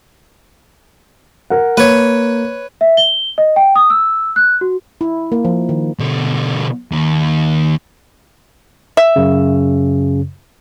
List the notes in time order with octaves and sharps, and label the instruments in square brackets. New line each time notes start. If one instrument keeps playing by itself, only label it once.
[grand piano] A#4 F#5
[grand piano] A#3 [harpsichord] B4 C#5
[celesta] E5
G7
D#5
G5
D#6
E6
F#6
F#4
[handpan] E4
A#3
F3
D#3
[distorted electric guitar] B2 D3
D#2
[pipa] E5
[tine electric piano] F#2 C#3